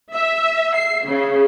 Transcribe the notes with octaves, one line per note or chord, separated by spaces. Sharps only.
E5
C7
C#3